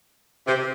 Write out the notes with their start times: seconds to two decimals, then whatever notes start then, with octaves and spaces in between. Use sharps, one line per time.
0.47 C3